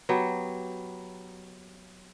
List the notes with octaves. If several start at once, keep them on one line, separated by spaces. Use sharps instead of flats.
F#3 B3 G4